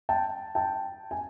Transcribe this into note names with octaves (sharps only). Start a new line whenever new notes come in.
G5 A5
G5 A5
G#5